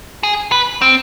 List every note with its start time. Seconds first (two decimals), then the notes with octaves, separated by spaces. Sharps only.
0.23 G#4
0.52 B4
0.81 C4